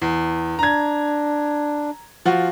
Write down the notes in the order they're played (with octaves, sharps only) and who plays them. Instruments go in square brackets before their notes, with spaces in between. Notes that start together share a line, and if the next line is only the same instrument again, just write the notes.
[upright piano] E2
[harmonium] D4 [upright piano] A#5 G#6
[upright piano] F3 F4 F#4